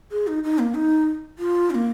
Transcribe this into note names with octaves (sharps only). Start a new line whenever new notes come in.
G#4
D#4
D#4
A#3
D#4
F4
C#4
A#3